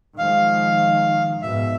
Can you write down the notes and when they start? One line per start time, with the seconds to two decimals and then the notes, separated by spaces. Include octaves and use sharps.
0.18 D#3 F3 G#3 F5
1.42 G#2 B2 E5